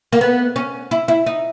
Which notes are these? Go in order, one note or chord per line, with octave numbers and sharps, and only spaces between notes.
A#3
B3
C#4
E4
E4
D#4